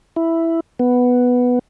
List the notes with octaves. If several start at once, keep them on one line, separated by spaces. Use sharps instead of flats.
E4
B3